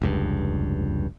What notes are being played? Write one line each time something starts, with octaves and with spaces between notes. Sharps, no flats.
F1 C#2 G2